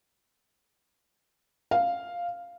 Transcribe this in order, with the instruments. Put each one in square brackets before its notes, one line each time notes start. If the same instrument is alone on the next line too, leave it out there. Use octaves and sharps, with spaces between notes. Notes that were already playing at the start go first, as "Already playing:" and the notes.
[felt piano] F5